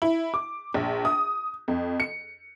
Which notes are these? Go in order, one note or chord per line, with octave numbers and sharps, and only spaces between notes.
E4
D6
A#1
D#6
F2
C#7